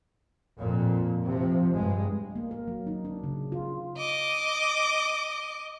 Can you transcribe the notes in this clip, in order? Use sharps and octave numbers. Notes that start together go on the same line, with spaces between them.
F2 A#2
C3 F3
G2 G#3
A#3
A#4
F#3
D#4
D4
C#3
F4
D#5 D6